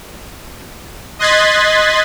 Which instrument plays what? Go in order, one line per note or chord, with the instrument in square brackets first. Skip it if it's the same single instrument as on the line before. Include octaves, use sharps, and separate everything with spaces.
[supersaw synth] D#5 C6 F#6 G#6 A6 B6